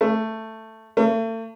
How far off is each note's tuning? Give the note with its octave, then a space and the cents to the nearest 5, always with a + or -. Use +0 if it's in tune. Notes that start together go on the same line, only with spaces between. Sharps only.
A3 +10
A3 +40